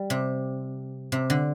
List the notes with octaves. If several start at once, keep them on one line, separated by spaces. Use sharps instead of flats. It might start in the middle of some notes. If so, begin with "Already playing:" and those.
Already playing: G3
C3
C3
D3